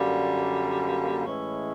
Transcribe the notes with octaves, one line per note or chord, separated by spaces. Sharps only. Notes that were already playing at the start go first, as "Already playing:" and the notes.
Already playing: F#2 D3 G3 A#3
A2 E3 G#3 C#4 E4